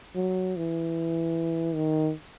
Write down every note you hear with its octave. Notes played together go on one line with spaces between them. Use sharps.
F#3
E3
D#3